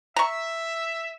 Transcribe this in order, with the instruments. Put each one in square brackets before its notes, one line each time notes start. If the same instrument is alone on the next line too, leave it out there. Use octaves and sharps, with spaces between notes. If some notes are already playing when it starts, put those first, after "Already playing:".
[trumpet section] E5 [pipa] A#5 C#6